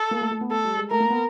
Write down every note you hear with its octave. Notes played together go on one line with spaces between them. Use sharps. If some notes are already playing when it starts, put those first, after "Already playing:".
Already playing: A4
A#3
A3
A3
B3
A3 A4
G3
G#3
A3 A#4
A#3
B3